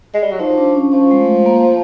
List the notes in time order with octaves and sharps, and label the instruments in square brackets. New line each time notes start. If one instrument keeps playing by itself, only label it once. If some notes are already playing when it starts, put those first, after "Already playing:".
[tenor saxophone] G#3
G3
F#3
[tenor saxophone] F3 [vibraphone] D#4
[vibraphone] D4
C#4
[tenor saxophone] F3 [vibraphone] C#4
[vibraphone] G#3
A3
A#3